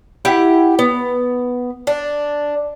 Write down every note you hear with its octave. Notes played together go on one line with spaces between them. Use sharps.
E4 G4 F#5
B3
D4